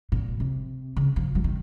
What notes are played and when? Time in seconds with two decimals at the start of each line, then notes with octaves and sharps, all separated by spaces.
0.12 A#2
0.40 C3
0.96 C#3
1.16 F3
1.35 F#3
1.44 D#3